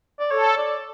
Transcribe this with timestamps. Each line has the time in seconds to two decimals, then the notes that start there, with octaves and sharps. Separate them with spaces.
0.20 D5
0.31 A4 C#5
0.58 D5